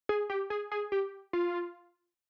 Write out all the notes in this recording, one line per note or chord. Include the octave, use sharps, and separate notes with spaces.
G#4
G4
G#4
G#4
G4
F4